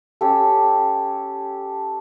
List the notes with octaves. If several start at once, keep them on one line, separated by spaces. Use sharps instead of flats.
C#4 G4 A4